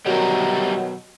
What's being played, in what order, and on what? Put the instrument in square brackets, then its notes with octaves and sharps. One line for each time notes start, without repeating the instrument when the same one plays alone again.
[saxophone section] B2 D#3 F#3 [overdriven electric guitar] G3 A#4